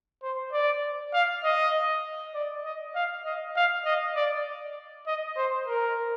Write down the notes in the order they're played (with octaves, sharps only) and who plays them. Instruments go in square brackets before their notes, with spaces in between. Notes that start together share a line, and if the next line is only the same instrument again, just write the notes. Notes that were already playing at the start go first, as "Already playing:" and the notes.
[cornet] C5
D5
F5
D#5
D5
D#5
F5
D#5
F5
D#5
D5
D#5
C5
A#4